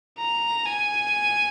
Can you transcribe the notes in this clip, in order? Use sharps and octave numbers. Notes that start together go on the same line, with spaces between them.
A#5
G#5